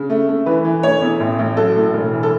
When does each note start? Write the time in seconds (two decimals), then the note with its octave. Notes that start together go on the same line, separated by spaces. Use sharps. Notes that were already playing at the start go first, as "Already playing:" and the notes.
Already playing: C#3
0.10 A3
0.29 A3
0.46 E3 B4
0.65 E3
0.83 A3 C#5
1.02 E2
1.20 A1
1.39 A1
1.56 F#3 A4
1.76 A2
1.94 E1
2.12 E3
2.23 A4